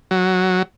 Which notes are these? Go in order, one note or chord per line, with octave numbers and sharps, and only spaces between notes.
F#3